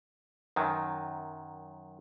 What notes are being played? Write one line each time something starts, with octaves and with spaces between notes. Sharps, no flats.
F#2 D#3 F#3